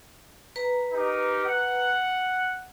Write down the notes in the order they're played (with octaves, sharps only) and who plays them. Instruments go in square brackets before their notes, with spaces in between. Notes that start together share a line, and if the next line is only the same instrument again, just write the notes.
[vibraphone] B4 A#5
[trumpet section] D#4 G4 A#4
F#5